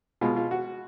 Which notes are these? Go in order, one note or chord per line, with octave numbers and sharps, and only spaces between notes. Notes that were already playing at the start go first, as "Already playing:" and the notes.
B2 G#3 F4
F4
F#4